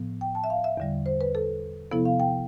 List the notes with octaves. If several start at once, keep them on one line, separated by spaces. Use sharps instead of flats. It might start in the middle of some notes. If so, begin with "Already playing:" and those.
Already playing: A2 F3 B3
G5
A5
E5
F5
E5
E2 D3 G3
C5
B4
A4
C3 F3 B3 E4 A4
F5
G5